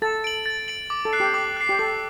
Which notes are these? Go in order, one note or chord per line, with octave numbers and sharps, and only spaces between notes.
A4 A6
D7 F#7
A6
D7 F#7
D6
A4
F#6 C7
G4
D6
F#6 C7
G4
A4 D6